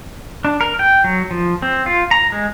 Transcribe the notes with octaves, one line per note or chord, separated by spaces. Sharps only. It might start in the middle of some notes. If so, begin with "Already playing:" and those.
D4
A#4
G5
F#3
F3
C4
F4
A#5
G#3